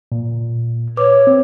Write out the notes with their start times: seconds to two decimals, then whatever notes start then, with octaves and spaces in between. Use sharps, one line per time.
0.12 A#2
0.97 B4 C#5 D6
1.27 C4